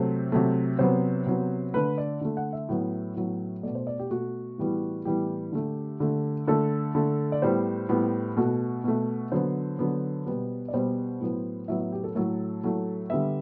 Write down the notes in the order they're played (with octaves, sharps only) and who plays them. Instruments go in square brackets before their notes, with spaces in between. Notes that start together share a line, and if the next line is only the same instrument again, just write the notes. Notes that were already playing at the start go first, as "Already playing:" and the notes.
Already playing: [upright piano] C3 F#3 A3 C5
C3 F#3 A3
C3 F#3 B3 C5
C3 F#3 B3
D3 A3 B4
D5
D3 A3
F#5
E5
A2 F#3 B3
A2 F#3 B3
B2 A3 D5
C5
D5
G4
B2 A3 F#4
A2 E3 G3 B3
A2 E3 G3 B3 G4
D3 A3
D3 A3
D3 A3 A4
D3 A3
D5
A2 G3 B3 C5
A2 G3 B3
B2 A3 F#4
B2 A3
D3 F#3 B3 C5
D3 F#3 B3
B2 G3 B3
D5
B2 G3 B3 C5
A2 F#3 B3
A2 F#3 B3 E5
E5
G4
A4
A2 F#3 A3 A4
A2 F#3 A3
D3 G3 B3 E5